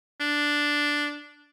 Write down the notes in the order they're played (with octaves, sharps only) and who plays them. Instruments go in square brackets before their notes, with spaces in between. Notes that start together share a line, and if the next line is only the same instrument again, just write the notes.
[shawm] D4